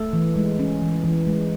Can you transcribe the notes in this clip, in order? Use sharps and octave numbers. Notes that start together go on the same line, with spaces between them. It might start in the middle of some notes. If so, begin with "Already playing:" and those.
Already playing: A3 A4
E3
G#3
C#4
E3
E3
G#3